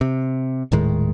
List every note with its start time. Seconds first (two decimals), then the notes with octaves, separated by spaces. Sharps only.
0.01 C3
0.72 D#1 A2 D#3 G#3